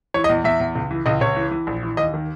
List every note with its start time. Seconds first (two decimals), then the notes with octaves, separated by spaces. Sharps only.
0.14 E3 C#5
0.24 D#5
0.30 E2
0.44 E2 E5
0.60 E2
0.76 C#2
0.91 E3
1.06 C#2 D#5
1.21 C#2 C#5
1.37 E3
1.51 E3
1.67 A#1
1.83 E3
1.97 D#2 D#5
2.14 D#3